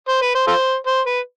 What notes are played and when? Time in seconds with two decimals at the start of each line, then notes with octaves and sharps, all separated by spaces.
0.09 C5
0.22 B4
0.35 C5
0.47 F4 A4 C5
0.87 C5
1.06 B4